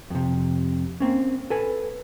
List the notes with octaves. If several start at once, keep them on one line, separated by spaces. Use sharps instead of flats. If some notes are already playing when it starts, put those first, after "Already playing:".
F2 C3
A#3 C4 C#4
A4 B4 G#5